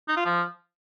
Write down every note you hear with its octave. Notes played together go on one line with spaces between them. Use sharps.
D#4
F4
F3